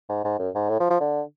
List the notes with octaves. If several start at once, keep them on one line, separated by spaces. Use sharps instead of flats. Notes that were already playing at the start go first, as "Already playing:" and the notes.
G#2
G#2
F#2
G#2
A2
F3
F3
D3